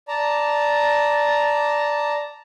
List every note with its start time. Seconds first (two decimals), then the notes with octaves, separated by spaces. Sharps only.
0.08 D5 A5 A#5